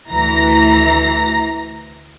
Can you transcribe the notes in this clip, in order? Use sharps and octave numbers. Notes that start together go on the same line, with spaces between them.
D2 E3 A#5 A#6